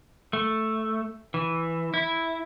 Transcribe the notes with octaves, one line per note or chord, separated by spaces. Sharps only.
A3
E3
E4